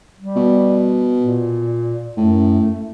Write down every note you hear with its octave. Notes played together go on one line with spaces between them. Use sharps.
G3
B2
A#2
F#2 A2
A3